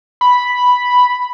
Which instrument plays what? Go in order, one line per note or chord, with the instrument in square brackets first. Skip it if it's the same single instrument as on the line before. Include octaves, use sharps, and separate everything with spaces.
[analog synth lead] B5